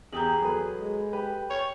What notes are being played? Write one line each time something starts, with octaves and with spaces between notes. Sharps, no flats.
E2 G4 G#4 A#5 D#6 G6 F#7
F#3 A4 B4
G#3
G4 B4
C#5 G5 F7